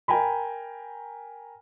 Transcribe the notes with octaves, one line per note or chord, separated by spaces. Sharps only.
A#4 G5 G#5 A#5 B5